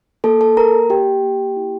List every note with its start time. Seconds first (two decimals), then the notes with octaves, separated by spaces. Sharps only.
0.24 A#3 A4 A5
0.41 A4 A5
0.57 A#3 A#4 A#5
0.90 A#3 G4 G5
1.23 A#3
1.56 E4